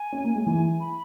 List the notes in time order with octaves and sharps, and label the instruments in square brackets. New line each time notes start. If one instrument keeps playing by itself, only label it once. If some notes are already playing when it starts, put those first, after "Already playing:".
Already playing: [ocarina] G#5
[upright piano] C#4
A#3
G#3
[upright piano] E3 [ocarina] G#5
[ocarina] B5